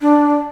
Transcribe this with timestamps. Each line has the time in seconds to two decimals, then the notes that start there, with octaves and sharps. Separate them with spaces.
0.01 D4